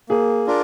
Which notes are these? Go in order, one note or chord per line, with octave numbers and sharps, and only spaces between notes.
A#3 G#4
D4 F4 A#4 D5